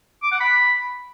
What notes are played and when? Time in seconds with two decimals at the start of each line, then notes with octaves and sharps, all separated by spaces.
0.23 D6
0.32 F#5
0.41 B5